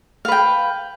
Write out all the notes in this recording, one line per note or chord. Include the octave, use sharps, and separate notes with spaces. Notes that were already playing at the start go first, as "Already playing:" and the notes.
B4 F5 G5